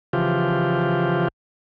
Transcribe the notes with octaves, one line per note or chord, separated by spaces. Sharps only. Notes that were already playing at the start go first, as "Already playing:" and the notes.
C#3 E3 F3 F4 G4